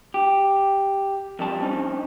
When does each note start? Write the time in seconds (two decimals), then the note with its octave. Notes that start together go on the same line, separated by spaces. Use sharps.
0.14 G4
1.39 F2 G3 A5
1.61 C4 C#4 D#4